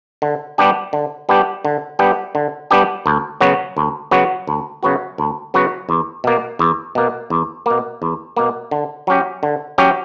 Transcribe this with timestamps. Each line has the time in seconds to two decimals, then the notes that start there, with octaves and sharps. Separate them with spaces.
0.22 D3
0.58 G3 B3 D4 G4
0.93 D3
1.29 G3 B3 D4 G4
1.65 D3
1.99 G3 B3 D4 G4
2.35 D3
2.71 G3 B3 D4 G4
3.06 D2
3.41 C#3 F#3 B3 F#4
3.77 D2
4.11 C#3 F#3 B3 F#4
4.47 D2
4.83 C#3 F#3 B3 F#4
5.18 D2
5.54 C#3 F#3 B3 F#4
5.89 E2
6.24 B2 A#3
6.59 E2
6.95 B2 A#3
7.30 E2
7.66 B2 A#3
8.02 E2
8.37 B2 A#3
8.71 D3
9.07 F#3 C#4 G4
9.43 D3
9.78 F#3 C#4 G4